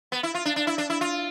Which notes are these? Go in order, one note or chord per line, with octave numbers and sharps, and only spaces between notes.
B3
E4
F4
D4
D4
E4
D4
E4
F4